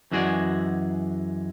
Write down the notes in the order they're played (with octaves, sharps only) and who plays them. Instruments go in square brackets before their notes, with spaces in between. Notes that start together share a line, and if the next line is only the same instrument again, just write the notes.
[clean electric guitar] F#2 E3 G#3 F#4 G#4 D5